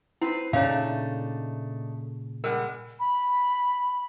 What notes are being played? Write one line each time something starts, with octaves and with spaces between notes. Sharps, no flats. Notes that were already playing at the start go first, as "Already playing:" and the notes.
C4 E4 B4
A#2 C#3 A3 D4 D#4 C#5 F5
G3 G#3 A#4 F#5
B5